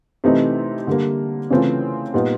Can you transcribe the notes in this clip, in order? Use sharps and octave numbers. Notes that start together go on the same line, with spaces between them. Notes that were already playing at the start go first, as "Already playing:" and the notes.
C3 E3 A3 C4 D#4
D3 G3 A#3
C#3 E3 A3 C4 F4
A#2 G3 B3 D#4